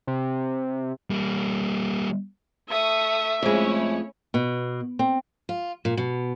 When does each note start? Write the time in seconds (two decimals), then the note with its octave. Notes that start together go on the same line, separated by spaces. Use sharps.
0.07 C3
1.10 G3 A#3
2.69 A3 E5 C#6 D#6
3.43 F2 G#3 A3 C#4 E4 C#5
4.34 B2
4.99 C4
5.49 F4
5.85 A#2
5.97 B2